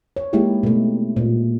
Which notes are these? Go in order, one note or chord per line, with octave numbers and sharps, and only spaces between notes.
C#5
G#3 A#3 D#4 E4 G4
B2 A3
A#2